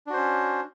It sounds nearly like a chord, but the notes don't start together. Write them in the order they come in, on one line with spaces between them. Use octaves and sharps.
D4 F#4 C5 C#4